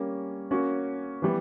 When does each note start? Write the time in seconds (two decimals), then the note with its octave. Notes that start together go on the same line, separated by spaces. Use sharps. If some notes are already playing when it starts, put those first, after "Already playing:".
Already playing: G3 A#3 C#4
0.51 A#3 C#4 F#4
1.22 E3 G3 B3